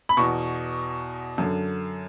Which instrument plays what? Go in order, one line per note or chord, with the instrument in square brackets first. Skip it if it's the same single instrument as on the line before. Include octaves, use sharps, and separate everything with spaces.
[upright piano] B5
E2 B2 C#6
F#2 D3